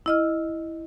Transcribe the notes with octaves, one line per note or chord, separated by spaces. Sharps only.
E4 D#5 F6